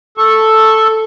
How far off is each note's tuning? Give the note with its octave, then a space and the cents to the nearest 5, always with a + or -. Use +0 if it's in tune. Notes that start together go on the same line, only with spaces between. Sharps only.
A4 +0 C#6 -15